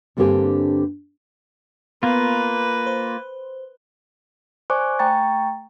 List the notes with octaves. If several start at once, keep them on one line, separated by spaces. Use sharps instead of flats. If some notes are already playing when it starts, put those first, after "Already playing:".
G2 D3 A#3 C4 G4 G#5
A#3 B3 F4 B4
C5
C5 D5 G#5 C#6 D6 F#6
A3 G5 A#5 C#6 A6